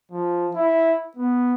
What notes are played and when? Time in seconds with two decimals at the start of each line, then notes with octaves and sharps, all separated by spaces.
0.12 F3
0.55 E4
1.17 B3